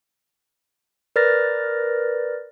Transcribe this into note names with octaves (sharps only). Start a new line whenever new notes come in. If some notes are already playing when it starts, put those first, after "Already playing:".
A#4 B4 D5 F6 A6 A#6